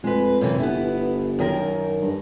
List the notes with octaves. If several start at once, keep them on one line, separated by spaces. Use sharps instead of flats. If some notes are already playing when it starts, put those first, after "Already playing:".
F2 G#3 B4
F#2 C3 E3
G1 B3 E4
F#2 D#3 A#4
G2